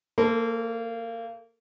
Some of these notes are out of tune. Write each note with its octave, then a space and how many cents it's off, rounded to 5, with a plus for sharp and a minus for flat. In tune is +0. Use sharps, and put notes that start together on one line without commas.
A#3 -25 A4 +5 C5 -20